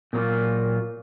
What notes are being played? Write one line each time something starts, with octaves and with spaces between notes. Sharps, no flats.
A#2 F#3 A#3 F4